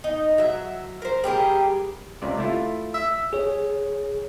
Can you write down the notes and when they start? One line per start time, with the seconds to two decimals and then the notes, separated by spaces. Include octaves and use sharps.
0.04 D#4
0.38 F#3 E5
1.02 A#4 C5
1.24 G3 G4 G#4 A#4
2.22 C#2 C3 D5
2.38 A3 E4 F4
2.94 E5
3.33 G#4 C#5